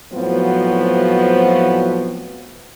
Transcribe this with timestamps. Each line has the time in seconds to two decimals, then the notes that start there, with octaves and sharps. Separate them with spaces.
0.13 A2 F3 F#3 B3 C4 F#4